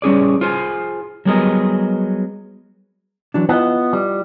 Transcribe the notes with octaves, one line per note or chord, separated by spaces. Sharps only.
G3 C#4 G#4 D5
F4 G#4 C5 G#5
F#3 G3 B3 G#4 A#4 D#5
E3 F#3 D4
B3 E4 F4 D#5
G3